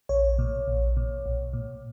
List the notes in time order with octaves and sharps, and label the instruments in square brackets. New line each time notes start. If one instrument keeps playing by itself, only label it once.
[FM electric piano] A#1 C#5
A#2
A#1
A#2
B1
A#2